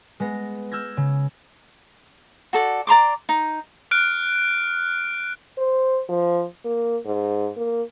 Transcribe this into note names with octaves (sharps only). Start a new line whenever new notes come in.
G#3 B3 A#6
E6 F6 G6 G#6 A#6
C#3
F#4 A4 D5
D5 A#5 C6 D6
D#4
F6 F#6 D7
C5
F3
A#3
G#2
A#3